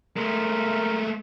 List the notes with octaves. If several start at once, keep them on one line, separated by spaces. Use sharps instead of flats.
G#3 A3 A#4